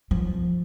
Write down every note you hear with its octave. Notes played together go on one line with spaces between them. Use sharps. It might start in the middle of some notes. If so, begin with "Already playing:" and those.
F3